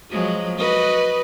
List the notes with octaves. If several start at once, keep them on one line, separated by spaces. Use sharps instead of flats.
F3 F#3 G#3
F#4 B4 D#5